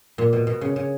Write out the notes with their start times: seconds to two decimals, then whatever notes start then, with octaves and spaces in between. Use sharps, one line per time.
0.18 A#2
0.33 B2
0.47 B2
0.61 C#3
0.76 C#3